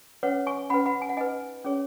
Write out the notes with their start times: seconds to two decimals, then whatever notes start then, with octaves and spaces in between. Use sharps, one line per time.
0.23 C#4 B4 C#5 F#5
0.47 G#5 C#6
0.70 C#4 B4 F#5 B5
0.86 F#5 B5
1.02 G#5
1.09 F#5
1.17 D#4 B4 D#5 G#5
1.65 C#4 G#4 C#5